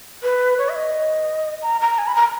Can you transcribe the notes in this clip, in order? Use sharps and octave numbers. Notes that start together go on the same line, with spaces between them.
B4
C#5
E5
D#5
A#5
A#5
G#5
B5
A#5